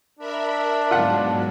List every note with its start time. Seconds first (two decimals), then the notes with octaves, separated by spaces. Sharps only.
0.19 D4 A#4 E5 B5
0.91 G#2 B2 F#3 F4 F#5